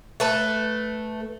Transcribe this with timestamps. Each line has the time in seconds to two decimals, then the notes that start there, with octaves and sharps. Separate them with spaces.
0.20 A3 B4 A5